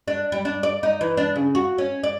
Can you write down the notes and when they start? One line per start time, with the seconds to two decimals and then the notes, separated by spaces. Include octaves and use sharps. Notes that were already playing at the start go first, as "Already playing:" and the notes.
0.08 D4
0.32 G3
0.45 D4
0.63 D5
0.83 D#4
1.01 E3
1.17 D4
1.36 C#3
1.55 F#4
1.78 C#4
2.03 D5